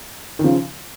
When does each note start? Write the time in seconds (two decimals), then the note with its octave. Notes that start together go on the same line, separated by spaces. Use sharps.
0.39 D#3
0.44 C#3 F3